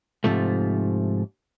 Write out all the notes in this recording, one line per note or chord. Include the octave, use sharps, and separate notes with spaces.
G#2 C3 F3 A3